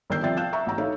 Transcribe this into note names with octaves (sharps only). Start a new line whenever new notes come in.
G1 D#3 A#4 E6 G6 C7
F3 C4 D5 E5 G5 A6
F5 A5 F#6 G6 E7
E5 A#5 C#6 E6
A1 F#5 A#5
D#4 A4 C#5 E5 F5